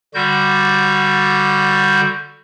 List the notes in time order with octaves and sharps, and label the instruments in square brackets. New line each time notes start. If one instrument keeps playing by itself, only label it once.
[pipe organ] D3 G3 F#4 G6